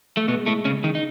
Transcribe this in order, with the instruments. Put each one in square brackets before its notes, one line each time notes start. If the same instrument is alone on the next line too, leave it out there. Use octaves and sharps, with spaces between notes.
[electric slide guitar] A3
[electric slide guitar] B2 B3 [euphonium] G#3
[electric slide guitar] A2 A3
C#3 C#4
D#3 D#4
D#4